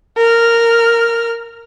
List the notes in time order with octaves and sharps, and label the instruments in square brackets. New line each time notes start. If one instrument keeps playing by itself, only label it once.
[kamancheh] A#4 F6